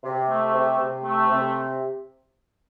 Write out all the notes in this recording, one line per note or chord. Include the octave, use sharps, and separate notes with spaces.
C3
A3
C3
C3
A3
C3